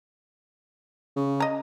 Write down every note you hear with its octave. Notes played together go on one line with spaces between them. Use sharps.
C#3
D#5 A#5